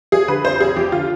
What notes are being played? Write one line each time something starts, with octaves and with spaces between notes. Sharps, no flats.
F3 G#4
D3 B4
F2 C5
F1 G#4
F3 G4
D3 F4